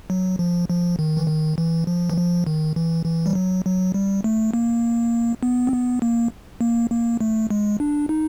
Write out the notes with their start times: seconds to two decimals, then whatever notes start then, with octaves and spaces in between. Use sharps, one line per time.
0.10 F#3
0.39 F3
0.69 F3
0.99 D#3
1.17 E3
1.28 D#3
1.58 E3
1.87 F3
2.10 E3
2.18 F3
2.47 D#3
2.76 E3
3.06 E3
3.26 G3
3.35 F#3
3.65 F#3
3.94 G3
4.24 A3
4.54 A#3
5.43 B3
5.67 C4
5.72 B3
6.02 A#3
6.61 A#3
6.91 A#3
7.21 A3
7.50 G#3
7.80 D4
8.09 D#4